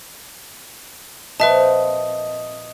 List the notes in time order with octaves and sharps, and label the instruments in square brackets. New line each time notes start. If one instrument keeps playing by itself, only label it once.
[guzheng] A#2 F3 C4 [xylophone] B4 E5 A5 [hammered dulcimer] D#5